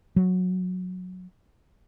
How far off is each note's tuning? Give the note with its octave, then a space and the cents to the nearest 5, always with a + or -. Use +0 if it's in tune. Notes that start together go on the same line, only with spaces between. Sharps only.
F#3 -15